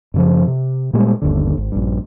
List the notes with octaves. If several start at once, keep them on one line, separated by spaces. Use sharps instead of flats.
F#2 C#3 F3
C3
A#2 G3 G#3 B3
G1 D#2 D3
G#1
A#1 G2